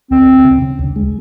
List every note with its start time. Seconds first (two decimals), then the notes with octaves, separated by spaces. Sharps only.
0.11 D2 C4
0.28 D2
0.44 C#3
0.62 C#3
0.79 D2
0.96 G#3